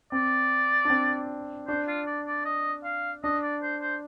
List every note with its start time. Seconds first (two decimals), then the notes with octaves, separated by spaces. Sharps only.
0.12 C4 D5
0.85 D4
0.90 C4
1.68 D4 C5
1.87 F4
2.07 D5
2.27 D5
2.45 D#5
2.84 F5
3.24 D4 D#5
3.43 D5
3.62 C5
3.82 C5